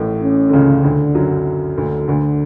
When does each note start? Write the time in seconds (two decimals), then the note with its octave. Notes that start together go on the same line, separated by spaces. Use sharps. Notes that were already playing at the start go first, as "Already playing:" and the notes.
Already playing: A1 A2
0.22 C#4
0.49 D3
0.53 C#2 C#3
0.84 D2 D3 D4
1.15 F#2 F#3
1.77 D2 D3
2.08 D2 D3 D4